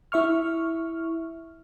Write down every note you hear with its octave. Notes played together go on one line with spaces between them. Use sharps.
E4 E5 C#6 F6